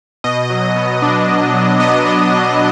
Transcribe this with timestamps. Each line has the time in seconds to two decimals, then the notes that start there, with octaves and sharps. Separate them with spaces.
0.24 B2 D#5
0.50 F#3
0.76 B3
1.02 D4
1.28 B2
1.54 F#3
1.79 B3 D#5
2.05 D4
2.31 B2